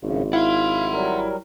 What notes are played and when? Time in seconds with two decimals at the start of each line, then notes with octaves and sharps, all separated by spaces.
0.03 G#1 F#2 A2 C#3
0.33 E4 F5 F#5 C6
0.92 F#3 G3 A#4